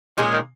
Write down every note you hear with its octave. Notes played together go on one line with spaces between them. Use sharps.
A#2 D#3 G#3 C#4 G#4
D#3